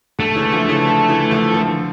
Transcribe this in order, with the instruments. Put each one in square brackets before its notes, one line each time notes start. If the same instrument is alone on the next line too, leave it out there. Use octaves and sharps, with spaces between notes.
[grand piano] D3 [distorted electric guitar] A3
[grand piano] C#3 E3
D3 F3
C#3 E3
D3
C#3 E3
D3 F3
D3 F3